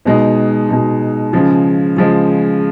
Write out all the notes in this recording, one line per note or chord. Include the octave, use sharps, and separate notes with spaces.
B2 G#3 D#4
B2 G#3 D#4
C#3 F3 G#3
C#3 F3 G#3